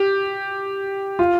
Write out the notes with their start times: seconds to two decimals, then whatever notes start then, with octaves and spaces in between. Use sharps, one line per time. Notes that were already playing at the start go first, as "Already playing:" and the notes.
Already playing: G4
1.19 F4